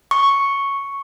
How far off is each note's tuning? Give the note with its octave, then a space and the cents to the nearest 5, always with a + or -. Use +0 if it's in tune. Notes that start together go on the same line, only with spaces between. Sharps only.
C#6 +0